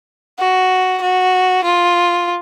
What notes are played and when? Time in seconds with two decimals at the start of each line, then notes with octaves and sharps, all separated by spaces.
0.39 F#4
1.02 F#4
1.64 F4